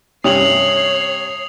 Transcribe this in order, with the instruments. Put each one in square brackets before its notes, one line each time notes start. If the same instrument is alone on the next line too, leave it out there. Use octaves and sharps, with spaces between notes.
[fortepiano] G2 C3 C#4 [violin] C#5 C7 [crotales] D#6 F7 F#7